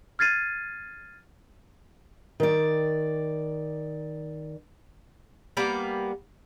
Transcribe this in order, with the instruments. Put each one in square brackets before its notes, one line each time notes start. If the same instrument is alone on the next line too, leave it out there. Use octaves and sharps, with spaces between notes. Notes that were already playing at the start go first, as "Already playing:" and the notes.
[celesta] F6 G#6 A6 C7 D#7
[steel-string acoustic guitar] D#3 D5
[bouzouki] G3 A#3 B3 D5